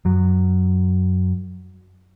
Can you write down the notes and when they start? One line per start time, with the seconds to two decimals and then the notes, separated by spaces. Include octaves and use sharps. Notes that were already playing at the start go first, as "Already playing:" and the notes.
0.05 F#2 F#3